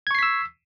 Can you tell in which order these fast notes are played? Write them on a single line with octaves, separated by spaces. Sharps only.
G#6 C#6 C7 B6 E6